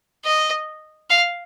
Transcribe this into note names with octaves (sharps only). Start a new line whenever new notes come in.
D#5
F5